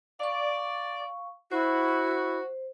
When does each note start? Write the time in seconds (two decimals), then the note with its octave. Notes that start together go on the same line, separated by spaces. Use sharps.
0.19 D5 F5 C#6
1.51 E4 F#4 C5